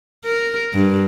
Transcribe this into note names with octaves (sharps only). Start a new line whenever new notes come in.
A#4
G2